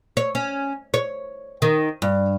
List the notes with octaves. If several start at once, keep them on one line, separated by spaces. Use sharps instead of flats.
C#5
C#4
C#5
D#3
G2